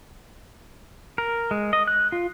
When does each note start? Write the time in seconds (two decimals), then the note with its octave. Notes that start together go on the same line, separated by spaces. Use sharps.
1.18 A#4
1.51 G#3
1.73 D#5
1.88 F#6
2.12 F4